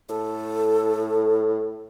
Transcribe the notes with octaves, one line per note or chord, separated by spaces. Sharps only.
A2 A4